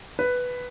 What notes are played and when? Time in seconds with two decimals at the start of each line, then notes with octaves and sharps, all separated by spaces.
0.19 B4